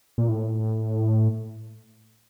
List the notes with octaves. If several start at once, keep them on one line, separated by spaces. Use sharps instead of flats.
A#2
A2